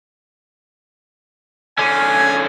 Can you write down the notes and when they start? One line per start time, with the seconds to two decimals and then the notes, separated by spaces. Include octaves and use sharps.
1.79 D3 C#4 G#5